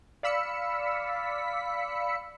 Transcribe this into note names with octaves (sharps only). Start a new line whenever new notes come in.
D5 F5 B5 E6 B6 C#7